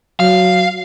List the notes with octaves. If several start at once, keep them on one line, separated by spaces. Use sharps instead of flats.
F#3 F5